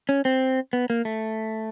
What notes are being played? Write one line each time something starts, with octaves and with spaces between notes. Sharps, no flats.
C#4
C4
B3
A#3
A3